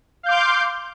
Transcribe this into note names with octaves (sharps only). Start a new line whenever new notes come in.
F5 C6 D6 G6